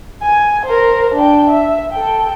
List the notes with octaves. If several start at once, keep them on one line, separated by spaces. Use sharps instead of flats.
G#5
A#4 C5
D4 G5
E5
A4 G5